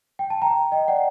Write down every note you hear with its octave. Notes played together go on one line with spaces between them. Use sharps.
G5
A5
G5 A#5
D#5 G5
D5 F#5